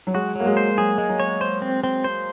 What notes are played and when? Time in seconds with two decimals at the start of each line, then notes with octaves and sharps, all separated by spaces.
0.07 F#3
0.14 G#3 F#4
0.35 F#3 A#3
0.46 G#3
0.57 C5
0.77 F#3 G#4
0.98 G#3
1.09 F#3
1.20 C#5
1.41 C5
1.62 C4
1.84 C4
2.04 C5